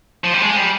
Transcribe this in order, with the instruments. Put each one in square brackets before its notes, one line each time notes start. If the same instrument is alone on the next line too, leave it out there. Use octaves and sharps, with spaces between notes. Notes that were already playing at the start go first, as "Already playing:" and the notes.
[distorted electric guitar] F3
G3
G#3
G3